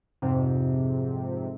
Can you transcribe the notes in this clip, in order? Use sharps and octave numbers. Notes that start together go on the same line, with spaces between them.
F2 G#2 C3